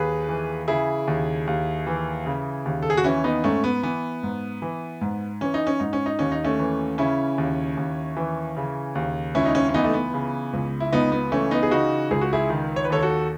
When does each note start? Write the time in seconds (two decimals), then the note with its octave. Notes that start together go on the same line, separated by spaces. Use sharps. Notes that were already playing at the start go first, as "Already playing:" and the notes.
Already playing: D#2 G#4 B4
0.29 E3
0.68 C#3 E4 G#4
1.07 D#2
1.47 D#2
1.87 E3
2.26 C#3
2.65 D#2
2.83 A4
2.90 G#4
2.97 F#4
3.04 E3 C#4 E4
3.24 B3 D#4
3.44 G#2 A3 C#4
3.64 B3
3.83 E3 B3
4.23 G#2
4.62 E3
5.01 G#2
5.41 E3 C#4
5.54 D#4
5.67 C#4
5.80 G#2 D#4
5.93 C#4
6.06 D#4
6.19 D#2 C#4
6.32 D#4
6.44 A3 C#4
6.60 E3
6.98 C#3 C#4 E4
7.38 D#2
7.77 D#2
8.16 E3
8.57 C#3
8.95 D#2
9.35 C#2 C#4 E4
9.45 D#4
9.55 C#4 E4
9.69 C#4
9.74 E3 B3 D#4
9.84 A3
9.94 B3
10.14 C#3
10.53 C#2
10.80 E4
10.92 C#2 B3 D#4
11.12 B3
11.32 E3 A3 C#4
11.51 B3 D#4
11.63 G#4
11.71 C#3 D#4 F#4
12.11 C#2 G#4
12.21 F#4
12.33 E4 G#4
12.50 D#3
12.76 C#5
12.85 B4
12.90 D#2 A4 C#5
13.02 F#4 A4